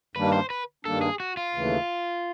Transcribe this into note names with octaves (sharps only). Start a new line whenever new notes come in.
G2 D#3 G3 A#3 D4 B4
C5
B4
G2 D#3 G3 A#3 D4 A4
G#4
F#4
F4
D#2 C#3 E3 A3